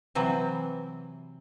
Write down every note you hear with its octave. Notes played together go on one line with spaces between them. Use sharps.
C3 E3 F#3 C4